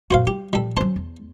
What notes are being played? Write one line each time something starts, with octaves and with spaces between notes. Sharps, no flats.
F#2 A#2 F#4 C5 F5
G3 G4
A#2 F3 G3 A4
F#3 C#4 C5 A5
E2